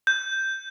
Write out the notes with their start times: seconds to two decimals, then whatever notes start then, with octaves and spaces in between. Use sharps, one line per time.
0.07 G6